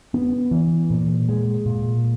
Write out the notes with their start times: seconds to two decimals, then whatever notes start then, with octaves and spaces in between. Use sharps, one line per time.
0.14 B3
0.51 E3
0.90 A#2
1.29 G#3
1.66 A#2